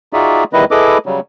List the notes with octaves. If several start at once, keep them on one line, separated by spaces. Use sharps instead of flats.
D#4 F4 F#4 G#4 D5 E5
E2 D#3 G3 E4 B4 D#5
E4 G#4 A4 B4 D#5 D6
C#3 F#3 G3